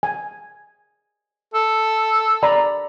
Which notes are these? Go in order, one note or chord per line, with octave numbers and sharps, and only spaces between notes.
G#5
A4
D5 A#5 B5